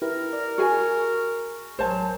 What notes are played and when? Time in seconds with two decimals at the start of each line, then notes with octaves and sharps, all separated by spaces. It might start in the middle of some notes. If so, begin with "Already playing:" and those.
0.02 E4 G4 A#4 B4
0.33 D5
0.58 F#4 G#4 G#5 C#6
1.79 A1 F#3 A#4 C5 C#5 G#5 A5